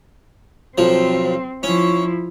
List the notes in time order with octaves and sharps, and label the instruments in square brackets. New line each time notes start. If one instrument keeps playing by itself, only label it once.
[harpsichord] B1 F3 [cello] C4
[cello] F3 E4 [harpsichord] C#4